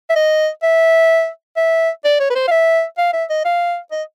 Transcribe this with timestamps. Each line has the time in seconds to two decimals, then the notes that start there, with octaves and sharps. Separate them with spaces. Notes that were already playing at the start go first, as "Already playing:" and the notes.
0.10 E5
0.16 D#5
0.63 E5
1.57 E5
2.05 D5
2.20 C#5
2.30 B4
2.35 C5
2.47 F5
2.51 E5
2.98 F5
3.13 E5
3.30 D#5
3.45 F5
3.92 D#5